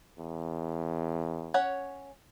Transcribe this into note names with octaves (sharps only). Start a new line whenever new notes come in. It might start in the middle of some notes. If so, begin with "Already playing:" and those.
E2
C#4 C#5 F#5